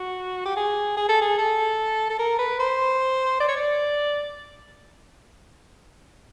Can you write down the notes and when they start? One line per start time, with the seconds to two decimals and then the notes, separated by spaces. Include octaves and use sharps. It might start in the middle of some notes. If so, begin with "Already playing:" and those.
Already playing: F#4
0.46 G4
0.57 G#4
0.97 G#4
1.09 A4
1.21 G#4
1.38 A4
2.10 A4
2.19 A#4
2.39 B4
2.59 C5
3.40 D5
3.49 C#5
3.57 D5